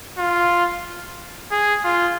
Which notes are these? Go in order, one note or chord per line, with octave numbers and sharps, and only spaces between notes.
F4
G#4
F4